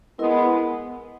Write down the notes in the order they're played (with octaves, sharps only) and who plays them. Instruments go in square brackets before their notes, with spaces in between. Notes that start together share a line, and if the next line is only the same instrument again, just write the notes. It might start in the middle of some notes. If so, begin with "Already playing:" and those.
[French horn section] G#3 B3 [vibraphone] E4 A#4 D#5